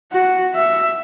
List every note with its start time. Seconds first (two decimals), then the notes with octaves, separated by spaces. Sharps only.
0.12 F#4
0.54 E5